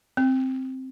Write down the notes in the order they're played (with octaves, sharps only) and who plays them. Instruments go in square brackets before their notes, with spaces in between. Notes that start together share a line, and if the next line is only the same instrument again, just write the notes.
[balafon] C4